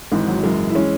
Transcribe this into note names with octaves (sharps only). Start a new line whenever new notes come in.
G#1 G#2 E3 G#3
F#3
F#1 F#2 E3 G#3
E4
E3 G#3 C#4